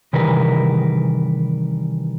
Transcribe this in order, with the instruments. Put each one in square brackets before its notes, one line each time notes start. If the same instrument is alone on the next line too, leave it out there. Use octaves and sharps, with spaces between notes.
[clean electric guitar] C3 D#3 E3 G3 A#4 B4